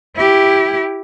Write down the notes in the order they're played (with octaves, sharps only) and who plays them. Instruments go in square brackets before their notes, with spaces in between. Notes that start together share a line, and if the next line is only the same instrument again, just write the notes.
[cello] E4 G4